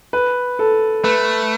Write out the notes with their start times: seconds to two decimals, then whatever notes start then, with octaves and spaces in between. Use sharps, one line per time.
0.13 B4
0.59 A4
1.04 A3 B4